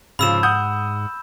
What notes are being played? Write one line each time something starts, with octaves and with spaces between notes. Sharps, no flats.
G#2 C#3 F3 B5 E6 E7
F#5 D#6 G6